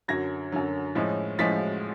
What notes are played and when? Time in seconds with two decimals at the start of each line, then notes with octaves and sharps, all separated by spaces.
0.08 F#2 D3 F#3 G#6 A#6
0.52 F#2 D3 F#3
0.95 A2 F3 G#3 C#4
1.39 A2 F3 G#3 C#4 A6 B6